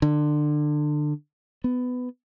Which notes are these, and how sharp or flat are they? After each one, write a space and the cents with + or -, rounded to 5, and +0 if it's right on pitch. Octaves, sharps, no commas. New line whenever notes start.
D3 +25
B3 +15